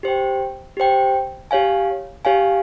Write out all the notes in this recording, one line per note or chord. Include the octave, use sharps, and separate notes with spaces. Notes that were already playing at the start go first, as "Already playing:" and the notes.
G4 C5 G5
G4 C5 G5
G4 C#5 F5 G#5
G4 C#5 F5 G#5